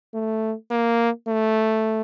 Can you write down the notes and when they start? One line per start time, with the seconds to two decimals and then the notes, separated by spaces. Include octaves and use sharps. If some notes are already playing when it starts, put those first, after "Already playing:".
0.14 A3
0.71 A#3
1.28 A3